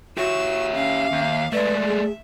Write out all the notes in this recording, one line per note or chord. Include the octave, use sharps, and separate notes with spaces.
F#4 G4 C#5 E5 E6
C#4 F5
D#2
G#3 A3 B4 D5 E5
G#4